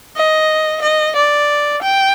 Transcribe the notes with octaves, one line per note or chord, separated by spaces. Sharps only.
D#5
D#5
D5
G5